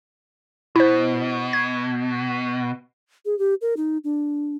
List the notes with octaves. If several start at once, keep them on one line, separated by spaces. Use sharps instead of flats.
B2 E4 C5
G#6
G#4
G4
A#4
D#4
D4